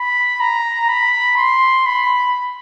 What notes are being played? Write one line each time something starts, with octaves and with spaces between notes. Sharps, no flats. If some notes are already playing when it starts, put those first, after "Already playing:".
Already playing: B5
A#5
B5
C6
B5